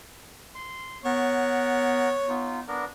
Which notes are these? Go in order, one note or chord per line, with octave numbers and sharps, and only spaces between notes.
C6
B3 A#4 C#5 F#5
B3 D#4 F4
B3 D4 A#4